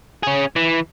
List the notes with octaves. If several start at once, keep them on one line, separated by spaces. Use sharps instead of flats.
C#4 G#4
E3